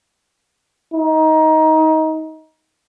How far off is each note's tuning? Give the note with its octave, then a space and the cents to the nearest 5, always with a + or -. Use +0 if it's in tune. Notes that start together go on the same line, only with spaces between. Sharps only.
D#4 +20